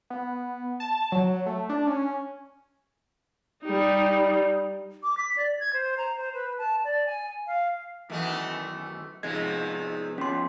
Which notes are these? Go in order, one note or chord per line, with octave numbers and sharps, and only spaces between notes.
B3
A5
F#3
A3
D4
C#4
G3 D#4
D6
B6
D5
G#6
C5
A#5
C5
B4
A5
D5
G#5
F5
F#2 D#3 E3 A3 B3 D#5
G#2 C3 F3 B3 G#4 D#5 G#6
F3 B3 C#4 C6